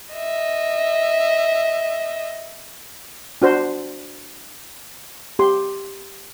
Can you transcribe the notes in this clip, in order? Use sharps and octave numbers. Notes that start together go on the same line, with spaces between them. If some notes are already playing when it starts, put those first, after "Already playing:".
D#5 E5
D4 F#4 C5
G4 C6